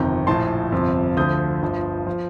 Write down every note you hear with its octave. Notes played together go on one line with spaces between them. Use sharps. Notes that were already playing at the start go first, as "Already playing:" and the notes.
Already playing: G1 F2 C3 D#3 G5 A#5
A#1 A2 F3 A5 C6
G1 F2 C3 F3
D2 D3 F3 D#6 G6
G1 G2 F3
F3